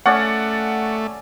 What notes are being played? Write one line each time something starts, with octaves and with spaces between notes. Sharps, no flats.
A3 C#4 D5 F#5